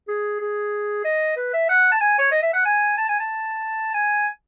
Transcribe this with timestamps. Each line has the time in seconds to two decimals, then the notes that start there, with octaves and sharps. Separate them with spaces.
0.08 G#4
0.41 G#4
1.05 D#5
1.36 B4
1.53 E5
1.69 F#5
1.92 A5
2.01 G#5
2.19 C#5
2.31 D#5
2.42 E5
2.53 F#5
2.65 G#5
2.97 A5
3.09 G#5
3.19 A5
3.94 G#5